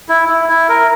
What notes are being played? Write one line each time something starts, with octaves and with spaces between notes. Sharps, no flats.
E4
E4
E4
A#4